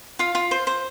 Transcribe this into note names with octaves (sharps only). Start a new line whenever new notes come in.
F4 F5
F4
C5
C5